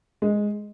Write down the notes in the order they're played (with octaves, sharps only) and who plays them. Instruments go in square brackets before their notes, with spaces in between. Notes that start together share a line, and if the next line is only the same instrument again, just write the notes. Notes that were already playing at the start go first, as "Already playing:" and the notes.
[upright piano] G#3